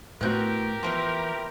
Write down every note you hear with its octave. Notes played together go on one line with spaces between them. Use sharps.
A2 B3 C4 F#4 G4 A#4 F#6 G6
E3 F3 A#3 B3 E4 C5